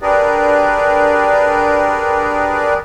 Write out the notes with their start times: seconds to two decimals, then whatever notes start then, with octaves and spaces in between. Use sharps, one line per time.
0.02 D4 G4 G#4 A#4 B4 D5